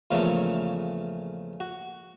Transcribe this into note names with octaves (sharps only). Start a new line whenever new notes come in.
E2 A#2 C#3 F3 A3 C#4
F#4